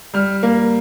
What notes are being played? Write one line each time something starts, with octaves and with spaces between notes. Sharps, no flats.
G3 F6
A#3